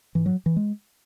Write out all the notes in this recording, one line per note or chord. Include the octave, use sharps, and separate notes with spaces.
G#2 E3
F#3
E3
G#3